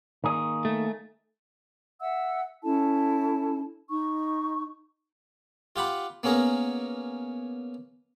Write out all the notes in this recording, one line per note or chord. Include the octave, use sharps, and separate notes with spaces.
D#3 A#3 G#4
A3
E5 F#5 E6
C#4 E4 A4 A5
D#4 C#6
F4 G4 F#5 B5
A#3 B3 C#4 G#4 A#4